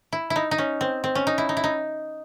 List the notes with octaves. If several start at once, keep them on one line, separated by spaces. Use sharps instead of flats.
E4
E4
D#4
D#4
C#4
C4
C4
C#4
D#4
E4
D#4
E4
D#4